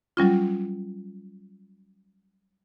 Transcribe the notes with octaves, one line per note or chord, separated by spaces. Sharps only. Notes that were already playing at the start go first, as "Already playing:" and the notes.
F#3 G3 C#4 F4